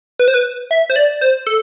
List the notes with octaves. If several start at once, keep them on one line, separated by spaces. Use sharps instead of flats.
B4
C5
B4
E5
C5
D5
C5
A4